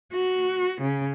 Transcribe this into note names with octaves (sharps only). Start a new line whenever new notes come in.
F#4
C#3